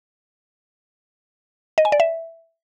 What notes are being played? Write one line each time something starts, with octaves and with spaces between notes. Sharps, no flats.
D#5
G#5
D5
E5